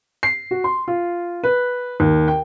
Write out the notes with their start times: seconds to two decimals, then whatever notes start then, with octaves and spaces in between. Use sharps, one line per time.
0.23 C7
0.51 F#4
0.64 C6
0.88 F4
1.44 B4
2.00 D#2
2.28 G5